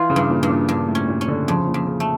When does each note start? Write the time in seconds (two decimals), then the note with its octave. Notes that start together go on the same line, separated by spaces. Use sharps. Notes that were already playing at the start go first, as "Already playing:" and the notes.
Already playing: E3 F4
0.10 C#3
0.16 G2
0.29 A#2
0.43 G2
0.49 A#2
0.69 G2 A#2
0.88 A2
0.95 C#4
1.08 A#2
1.21 C#4
1.28 D3
1.48 F2 C#3
1.67 A#2
1.74 F2
1.87 C#3
2.00 A3